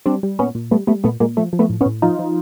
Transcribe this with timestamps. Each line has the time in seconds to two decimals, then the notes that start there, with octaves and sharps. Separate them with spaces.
0.06 G3 C4 D4
0.23 G3
0.39 A#2 B3 C#4
0.55 A#2
0.71 G3 A3 B3
0.87 G3 A3 B3
1.04 A#2 A3 B3
1.20 A#2 G#3 A#3
1.37 F3 A3
1.53 F3
1.59 A3 B3
1.70 A2
1.81 B3 C#4
1.86 A2
2.02 F3 D#4 F4
2.19 F3